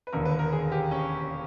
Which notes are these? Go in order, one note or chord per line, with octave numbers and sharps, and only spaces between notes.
B4
E1 D#2 D3 A#4
B4
A#4
G#4
G4
C#4